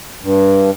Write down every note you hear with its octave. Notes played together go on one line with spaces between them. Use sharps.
G2